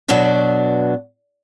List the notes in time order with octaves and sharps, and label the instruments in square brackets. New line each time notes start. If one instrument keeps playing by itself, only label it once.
[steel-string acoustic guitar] B2 F#3 B3 D4 F#4